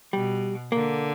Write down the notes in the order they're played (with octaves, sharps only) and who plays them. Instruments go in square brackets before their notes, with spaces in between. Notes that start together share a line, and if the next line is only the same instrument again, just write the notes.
[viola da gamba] B2 [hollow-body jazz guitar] G3
[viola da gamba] D3 [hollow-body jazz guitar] A#3